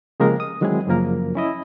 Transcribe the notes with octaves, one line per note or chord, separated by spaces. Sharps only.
C#3 F3 G#3 A#3 G4 A#4
D#6
D#3 F#3 G#3 C4 E4 G#4
F#2 C#3 F3 A#3 A#4
C#4 E4 D#5